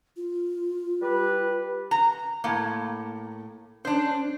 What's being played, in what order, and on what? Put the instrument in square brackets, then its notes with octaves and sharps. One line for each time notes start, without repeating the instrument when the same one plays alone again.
[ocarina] F4
[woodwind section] G3 G4 B4
[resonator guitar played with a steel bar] A#5
A2 A#3
[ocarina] C#4 [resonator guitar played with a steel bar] D4 C5